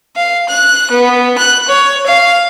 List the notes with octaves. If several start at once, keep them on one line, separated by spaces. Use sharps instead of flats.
F5
F#6
B3
F#6
C#5
F5